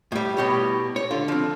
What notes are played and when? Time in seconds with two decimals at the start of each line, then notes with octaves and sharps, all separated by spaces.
0.12 A2 G3
0.37 B2 G4 C#5
0.96 C#5
1.11 D3 F4
1.28 F3 C4